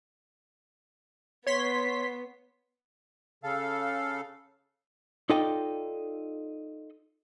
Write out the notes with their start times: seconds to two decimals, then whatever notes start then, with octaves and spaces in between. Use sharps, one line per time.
1.47 B3 C#5 C6 B6
3.44 C#3 A4 F5
5.30 D#4 F4 A4 D5 D#5 G5